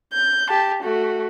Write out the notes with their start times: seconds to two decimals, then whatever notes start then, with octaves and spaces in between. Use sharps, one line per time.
0.13 G6
0.50 G4 A5
0.83 A3 F#4